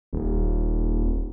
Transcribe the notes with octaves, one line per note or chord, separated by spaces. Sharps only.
D#1